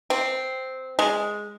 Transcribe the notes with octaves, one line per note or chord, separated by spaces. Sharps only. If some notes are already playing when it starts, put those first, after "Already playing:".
C4
G#3